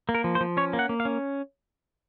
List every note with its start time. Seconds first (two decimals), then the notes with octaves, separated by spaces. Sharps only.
0.09 A#3
0.15 A#4
0.24 F3
0.35 C5
0.41 F3
0.57 C#4 C#5
0.73 A#3
0.79 F#5
0.89 A#3
1.00 F5
1.05 C#4